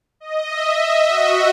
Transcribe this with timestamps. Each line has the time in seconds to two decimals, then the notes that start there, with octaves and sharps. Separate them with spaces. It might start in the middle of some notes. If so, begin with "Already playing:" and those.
0.20 D#5
0.49 E5
0.79 D#5
1.08 F#4